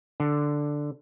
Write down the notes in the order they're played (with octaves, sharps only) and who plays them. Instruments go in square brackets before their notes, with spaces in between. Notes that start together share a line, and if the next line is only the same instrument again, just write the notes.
[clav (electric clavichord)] D3